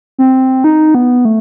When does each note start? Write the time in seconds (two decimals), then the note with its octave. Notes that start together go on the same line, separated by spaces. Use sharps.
0.19 C4
0.64 D#4
0.95 B3
1.25 A3